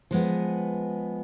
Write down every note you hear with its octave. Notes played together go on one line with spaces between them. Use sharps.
F3 G#3 B3